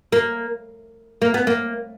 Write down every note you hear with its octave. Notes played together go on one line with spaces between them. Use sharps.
A#3
A#3
B3
A#3